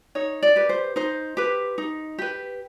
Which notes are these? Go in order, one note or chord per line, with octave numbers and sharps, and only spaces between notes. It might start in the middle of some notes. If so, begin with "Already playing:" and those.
D#4 C#5
D5
G4 B4
C5
D#4 C5
G4 B4
D#4
G4 B4